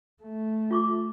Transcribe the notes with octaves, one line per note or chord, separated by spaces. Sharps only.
A3
F4 C#6 D6